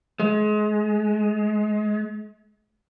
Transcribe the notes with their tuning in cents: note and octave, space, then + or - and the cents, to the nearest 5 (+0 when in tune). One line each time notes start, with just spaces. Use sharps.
G#3 +30